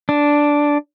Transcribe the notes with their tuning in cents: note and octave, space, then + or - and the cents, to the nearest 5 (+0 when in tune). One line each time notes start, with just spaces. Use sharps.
D4 -5